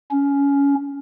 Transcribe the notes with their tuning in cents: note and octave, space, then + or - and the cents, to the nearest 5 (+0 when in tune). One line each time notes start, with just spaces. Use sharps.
C#4 +20